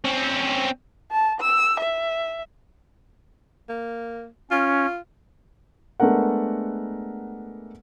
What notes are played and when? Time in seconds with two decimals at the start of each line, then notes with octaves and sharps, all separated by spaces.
0.04 C4 C#4
1.11 A5
1.41 E6
1.80 E5
3.70 A#3
4.51 C#4 F4
6.00 G#3 A3 B3 D4 A#4 F#5